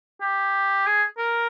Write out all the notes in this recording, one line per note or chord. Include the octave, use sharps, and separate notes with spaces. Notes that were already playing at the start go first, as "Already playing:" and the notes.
G4
G#4
A#4